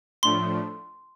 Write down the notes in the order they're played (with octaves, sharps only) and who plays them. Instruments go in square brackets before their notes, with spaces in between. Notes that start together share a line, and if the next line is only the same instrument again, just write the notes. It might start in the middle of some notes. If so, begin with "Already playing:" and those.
[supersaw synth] A2 F3 A3 D4 [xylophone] C6